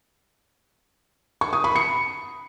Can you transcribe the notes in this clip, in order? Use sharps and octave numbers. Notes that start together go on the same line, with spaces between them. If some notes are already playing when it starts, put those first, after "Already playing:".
C#6
D#6
B5
C#7